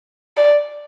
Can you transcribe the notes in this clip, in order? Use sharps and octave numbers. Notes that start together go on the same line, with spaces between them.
D5